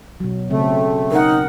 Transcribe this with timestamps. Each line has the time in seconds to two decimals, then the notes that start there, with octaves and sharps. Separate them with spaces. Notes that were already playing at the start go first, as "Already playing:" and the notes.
0.20 B2 F#3
0.50 C#3 A3 C4
1.12 D#4 A#4 F#5